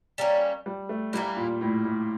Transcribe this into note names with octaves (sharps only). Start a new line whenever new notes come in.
G3 A#3 C#4
G3
A3
E3 G3 A#3 E4
A#2
A2
A2